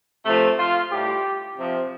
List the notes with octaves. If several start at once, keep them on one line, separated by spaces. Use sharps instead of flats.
C3 F3 A3
F4
A2 G3 G4
C3 F3